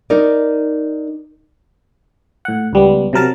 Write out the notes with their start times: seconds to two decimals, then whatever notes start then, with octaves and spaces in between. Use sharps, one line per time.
0.10 D#4 A#4 D5
2.45 A2 F#5
2.73 C#2 G3 B3
3.13 C3 F#3 A#4 A5